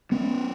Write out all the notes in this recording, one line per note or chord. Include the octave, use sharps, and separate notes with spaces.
B3 C#4